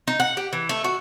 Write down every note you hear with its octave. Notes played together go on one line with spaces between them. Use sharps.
D#4
F#5
G4
E3
A3
F#4